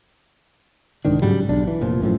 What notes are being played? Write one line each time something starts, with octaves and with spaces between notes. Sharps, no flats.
C2 G#2 D#3 D4
G#2 C#3 F#3 G3
B1 D4
E3
F1 A#2 F3
F#2 A2 F3